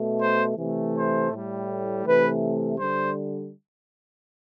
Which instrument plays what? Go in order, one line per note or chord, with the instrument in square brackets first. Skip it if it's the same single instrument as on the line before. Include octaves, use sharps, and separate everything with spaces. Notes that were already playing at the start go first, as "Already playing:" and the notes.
Already playing: [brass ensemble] B2 A3
C5
C3 E3 A3
C5
A2 G3
C3 E3 A3 B4
D3 G3 C5